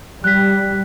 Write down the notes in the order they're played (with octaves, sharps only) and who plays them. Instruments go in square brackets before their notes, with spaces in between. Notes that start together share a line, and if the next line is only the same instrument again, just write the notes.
[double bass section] G3 [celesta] F#6 B6